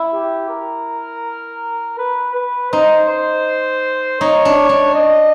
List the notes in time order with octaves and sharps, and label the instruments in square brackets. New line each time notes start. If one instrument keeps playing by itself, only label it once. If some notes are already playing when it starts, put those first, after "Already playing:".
Already playing: [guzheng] E4
[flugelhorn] G4
A#4
B4
B4
[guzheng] D#4 [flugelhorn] C5
[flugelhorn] C5
[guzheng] D#4 [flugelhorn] C#5
[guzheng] D4
D4
[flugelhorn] D#5